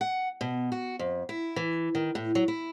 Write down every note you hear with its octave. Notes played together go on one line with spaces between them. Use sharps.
F#5
B2
F#4
F2
E4
E3
D#3
A2
F#3
E4